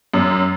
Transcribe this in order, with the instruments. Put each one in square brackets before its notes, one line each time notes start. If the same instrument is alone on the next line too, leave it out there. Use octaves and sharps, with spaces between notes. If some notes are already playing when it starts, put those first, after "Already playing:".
[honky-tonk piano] F#2